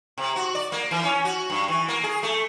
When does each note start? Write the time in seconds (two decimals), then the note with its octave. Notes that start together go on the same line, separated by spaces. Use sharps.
0.18 C3
0.36 F#4
0.55 D5
0.72 A#3
0.91 E3
1.04 C#4
1.25 F#4
1.50 G2
1.68 E3
1.88 A#3
2.04 G#4
2.23 A3